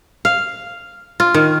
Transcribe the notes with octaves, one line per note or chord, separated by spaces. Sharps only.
F5
F4
D#3